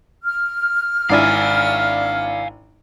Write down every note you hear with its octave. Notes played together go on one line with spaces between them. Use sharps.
F6
G#1 D4 E4 F5 G#5